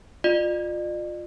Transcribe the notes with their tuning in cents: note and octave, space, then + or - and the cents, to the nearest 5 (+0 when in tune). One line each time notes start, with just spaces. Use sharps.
F4 +15 D5 +45